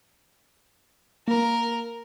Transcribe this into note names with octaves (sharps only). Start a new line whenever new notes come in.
A#3 A#4